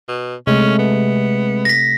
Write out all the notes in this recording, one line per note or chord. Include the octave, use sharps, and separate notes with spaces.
B2
C3 G#3 A3 C#4
B3
A#6 B6